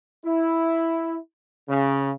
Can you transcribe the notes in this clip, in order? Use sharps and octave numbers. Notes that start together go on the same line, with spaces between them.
E4
C#3